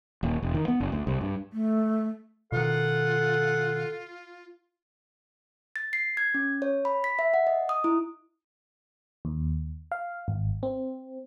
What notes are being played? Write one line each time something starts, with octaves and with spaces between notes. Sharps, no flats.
D#1
E1
D#3
B3
F#1
D2
C2
G2
A3
B2 D#3 F4 A4 F#5
A6
C7
G#6
C#4
C#5
B5
B6
E5
F#5
D#5
D#6
E4
D#2
F5
G#1
C4